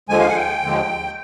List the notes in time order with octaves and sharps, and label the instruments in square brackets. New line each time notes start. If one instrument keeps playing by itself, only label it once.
[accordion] D#2 D3 F3 G#3 G#5
F5
F#5
G5
D#2 D3 F3 G#3